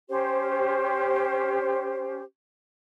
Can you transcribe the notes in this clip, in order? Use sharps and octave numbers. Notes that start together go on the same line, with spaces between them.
C#4 G4 C5